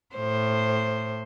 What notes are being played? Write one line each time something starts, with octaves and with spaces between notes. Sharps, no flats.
A2 C5